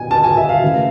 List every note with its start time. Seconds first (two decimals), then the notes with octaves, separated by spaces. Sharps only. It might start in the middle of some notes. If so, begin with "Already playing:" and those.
Already playing: B2 G#5
0.11 A5
0.24 G#5
0.37 E5
0.49 F5
0.62 C#3 E3 A3